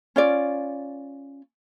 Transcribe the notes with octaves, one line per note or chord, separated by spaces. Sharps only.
C#4 F4 D5